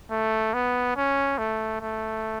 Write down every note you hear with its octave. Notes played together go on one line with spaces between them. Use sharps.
A3
B3
C#4
A3
A3